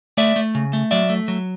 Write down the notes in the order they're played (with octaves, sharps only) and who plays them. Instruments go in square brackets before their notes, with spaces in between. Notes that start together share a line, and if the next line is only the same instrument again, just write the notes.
[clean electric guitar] A3 D5 E5
A3
C#3
A3
F#3 D5 E5
A3
F#3